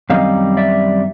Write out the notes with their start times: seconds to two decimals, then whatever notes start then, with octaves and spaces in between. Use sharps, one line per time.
0.10 F#2 D#3 G3 C4 D#4 D#5 F5
0.57 D5 E5